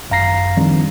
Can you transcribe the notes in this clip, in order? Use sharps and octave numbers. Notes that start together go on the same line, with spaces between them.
G#1 F#2 F5 A#5 A#6 C7
D#3 F3 G3 C4 D4